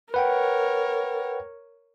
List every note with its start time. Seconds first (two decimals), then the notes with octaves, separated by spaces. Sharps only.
0.14 A#4 B4 C#5 F#5 G5